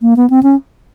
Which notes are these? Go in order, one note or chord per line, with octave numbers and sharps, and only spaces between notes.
A#3
B3
C4
C#4